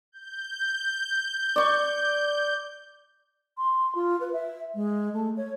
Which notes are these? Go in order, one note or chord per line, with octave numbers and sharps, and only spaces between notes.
G6
D5 C#6
C6
F4
B4
E5
G#3
A3
C#5